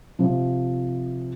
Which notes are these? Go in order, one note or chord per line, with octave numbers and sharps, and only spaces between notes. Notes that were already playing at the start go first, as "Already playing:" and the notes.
C3 F3